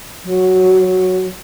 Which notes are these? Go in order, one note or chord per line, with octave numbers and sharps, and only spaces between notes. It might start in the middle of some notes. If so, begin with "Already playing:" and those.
F#3